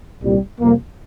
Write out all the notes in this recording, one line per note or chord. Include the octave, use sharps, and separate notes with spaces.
C2 A#2 G3
F2 C3 G3 A#3